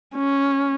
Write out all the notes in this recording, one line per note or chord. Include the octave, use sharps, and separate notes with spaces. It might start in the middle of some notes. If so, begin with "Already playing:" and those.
C#4